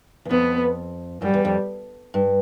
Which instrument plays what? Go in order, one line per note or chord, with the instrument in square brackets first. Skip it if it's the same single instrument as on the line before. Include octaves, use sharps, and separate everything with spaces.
[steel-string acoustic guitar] E2
[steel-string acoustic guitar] F2 [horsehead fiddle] B3
[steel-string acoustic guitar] F#2 [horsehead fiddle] G3
[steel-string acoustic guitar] E2
F2
G2